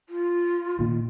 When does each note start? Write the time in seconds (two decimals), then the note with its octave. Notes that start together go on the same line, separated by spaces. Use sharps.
0.09 F4
0.79 A#2 D#3